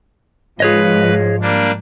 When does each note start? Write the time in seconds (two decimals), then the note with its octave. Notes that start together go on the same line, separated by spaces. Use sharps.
0.60 G#2 F3 G#4 B4 C#5 D#5
1.42 G3 A#3 D4